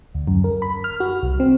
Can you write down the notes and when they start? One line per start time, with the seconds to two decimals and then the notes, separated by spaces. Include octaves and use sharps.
0.15 D2
0.28 F#2
0.44 A#4
0.62 B5
0.84 F6
1.00 F#4
1.23 C2
1.40 C4